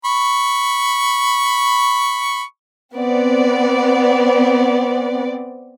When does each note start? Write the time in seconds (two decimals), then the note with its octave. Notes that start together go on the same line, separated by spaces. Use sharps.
0.05 B5 C#6
2.95 B3 C4 D5